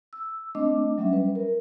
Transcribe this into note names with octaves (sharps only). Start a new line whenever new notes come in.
E6
A3 C4 D4 D#5 D6
F#3 G3 C#4 E5
B4
A#4